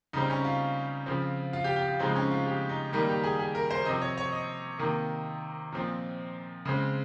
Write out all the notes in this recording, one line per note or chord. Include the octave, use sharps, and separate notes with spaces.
C#3 G3 C4 D#4
C#4
F4
C#3 F3 C4
F4
G4
G4
F4
C#3 F3 G#3 C4 D#4
C#4
F4
G4
D#4
D#3 G3 A#3 D#4
G4
G#4
G#4
A#4
C5
C3 F3 C4 D#5
C#5
C#5
D#5
C3 D#3 A#3
A#2 F3 C4
C#3 G#3 C4